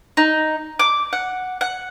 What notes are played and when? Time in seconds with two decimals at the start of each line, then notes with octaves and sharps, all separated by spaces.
0.17 D#4
0.79 D6
1.13 F#5
1.61 F#5